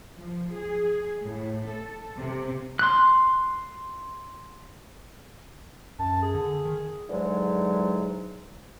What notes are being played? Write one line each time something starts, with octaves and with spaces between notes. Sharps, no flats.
F3
G#4
A2
A4
C3
C6 F#6
F#2 A5
G#4
D3
D#3
G#2 D3 E3 F#3 G#3